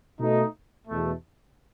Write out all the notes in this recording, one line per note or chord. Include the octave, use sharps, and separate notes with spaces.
B2 A3 D#4
E2 B2 A3